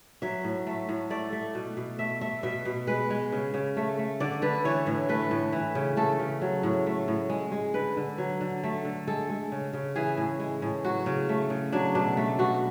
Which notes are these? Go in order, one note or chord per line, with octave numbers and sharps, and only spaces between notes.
F#3 E5
A2
A3
A2
A3 D5
A3
B2
B2
A3 E5
A3 E5
B2 E5
B2
G#3 B4
G#3
C#3
C#3
A3
A3
D3 D5
D3 B4
E3 C#5
A2
A3 B4
A2
E3
C#3
A3 A4
C#3
F#3
A2
A3
A2
G#3
G#3
D3 B4
D3
F#3
D3
A3
D3
G#3 A4
G#3
C#3
C#3
E3 G#4
A2
G#3
A2
F#3 F#4
C#3
A3
C#3
F#3 D4
B2 D4
A3
B2 F#4